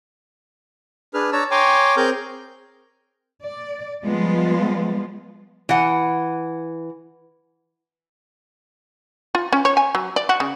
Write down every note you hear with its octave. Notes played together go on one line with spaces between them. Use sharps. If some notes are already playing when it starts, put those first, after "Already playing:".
D4 G#4 B4 F6
D4 C#5 A5 A#5 E6
C#5 G5 G#5 A#5 C6 D6
C4 G#4 A#4 A#5 F6 G6
D5
F3 G3 G#3 B3 F4
E3 F#5
F4
C#4
C#5
G#5
F#3
D5
F#4
C#3